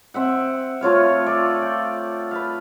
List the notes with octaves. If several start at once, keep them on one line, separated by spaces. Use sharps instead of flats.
C4 E5 F#5
A3 F4 C#5 F5
A4 D5
G5
B4 F5